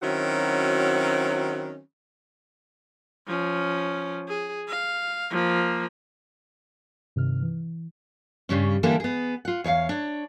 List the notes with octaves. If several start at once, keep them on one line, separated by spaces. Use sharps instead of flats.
D#3 F#3 C4 C#4 E4 F#4
F3 C#4
G#4
F5
F3 A#3
G2 C3 D#3 F6
E3
G2 C#3 G3 C#4
D3 E3 G3 A#3 G4 A4
B3 G#4
F4 F#5
E2 C#5 D5 F5
D4 C#5